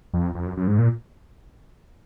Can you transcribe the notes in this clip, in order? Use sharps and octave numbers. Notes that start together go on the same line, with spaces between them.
F2
F2
F#2
F#2
G#2
A#2